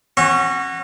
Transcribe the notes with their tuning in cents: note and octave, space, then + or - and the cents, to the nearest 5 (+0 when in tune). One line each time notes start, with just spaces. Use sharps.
C#4 -35 F#4 +0 C#6 -35